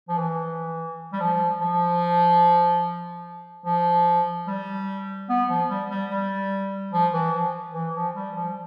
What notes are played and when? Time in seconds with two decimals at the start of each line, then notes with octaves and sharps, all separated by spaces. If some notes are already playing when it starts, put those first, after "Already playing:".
0.09 F3
0.17 E3
1.13 G3
1.20 F3
1.61 F3
3.65 F3
4.48 G3
5.29 B3
5.49 F3
5.69 G3
5.90 G3
6.10 G3
6.93 F3
7.13 E3
7.34 F3
7.74 E3
7.94 F3
8.15 G3
8.36 F3